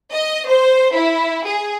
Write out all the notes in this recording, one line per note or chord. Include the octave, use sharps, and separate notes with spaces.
D#5
C5
E4
G#4